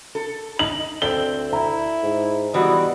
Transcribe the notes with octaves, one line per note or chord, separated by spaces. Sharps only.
A4
D#4 F#7
D2 C4 A4 D5 E5 G7
E4 A#5
G#2
E3 G3 B3 F#4 D#5